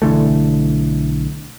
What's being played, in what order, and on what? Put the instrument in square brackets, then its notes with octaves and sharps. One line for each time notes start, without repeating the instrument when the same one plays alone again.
[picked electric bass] B1 D3 E3 A3